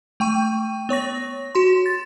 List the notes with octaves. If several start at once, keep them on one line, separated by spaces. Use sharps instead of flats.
A3 G5 C#6 D#7
B3 C#5 C#6 A#6
F#4 C6
A6